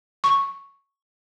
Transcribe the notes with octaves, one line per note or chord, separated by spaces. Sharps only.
C#6